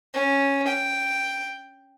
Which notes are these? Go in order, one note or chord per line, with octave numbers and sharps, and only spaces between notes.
C#4
G5